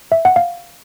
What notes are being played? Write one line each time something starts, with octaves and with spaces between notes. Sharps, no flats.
E5
F#5
F5